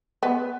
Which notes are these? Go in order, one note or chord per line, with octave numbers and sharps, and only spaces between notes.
B3